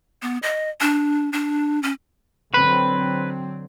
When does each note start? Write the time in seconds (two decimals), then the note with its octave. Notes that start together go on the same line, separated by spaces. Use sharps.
0.22 B3
0.43 D#5
0.80 D4
1.33 D4
1.83 C#4
2.54 D3 F#3 C4 B4